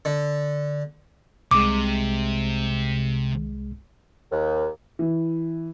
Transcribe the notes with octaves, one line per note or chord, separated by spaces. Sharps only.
D3
C2 C3 G#3 D6
D#2
E3